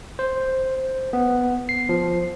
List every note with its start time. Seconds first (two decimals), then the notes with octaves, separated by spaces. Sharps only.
0.19 C5
1.13 B3
1.69 C7
1.89 F3